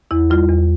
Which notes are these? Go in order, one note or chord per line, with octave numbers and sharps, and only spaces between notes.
E2 E4
G3 F4
E2